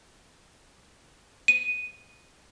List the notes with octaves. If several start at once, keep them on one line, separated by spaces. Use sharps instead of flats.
D#7